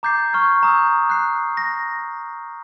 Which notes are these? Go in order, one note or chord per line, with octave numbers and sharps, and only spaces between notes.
A#5 D6 G6 A6 C7
A#5 C#6 F6 G6 G#6
A#5 D#6 E6 G6
F#6 C7
A#6